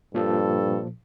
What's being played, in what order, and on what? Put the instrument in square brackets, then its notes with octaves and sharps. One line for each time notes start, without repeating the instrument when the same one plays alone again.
[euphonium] G2 [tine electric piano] A#2 F3 [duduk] A4